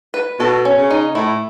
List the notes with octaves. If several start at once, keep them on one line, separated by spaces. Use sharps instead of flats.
B4
B2 A4
C#4
C#3
D#4
A2 E4